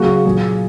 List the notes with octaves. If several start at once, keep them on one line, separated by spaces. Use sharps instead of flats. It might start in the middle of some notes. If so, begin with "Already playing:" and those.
Already playing: C#3 F#3 A#3 F#4
A#2 F#3 A#3 G#4